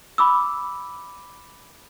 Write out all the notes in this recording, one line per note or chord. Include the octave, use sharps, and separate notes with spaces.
B5 D6 E6